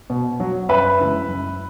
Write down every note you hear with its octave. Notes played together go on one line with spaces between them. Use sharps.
B2
F#3
F#2 B4 E5
C#3 E3 G#3
F#2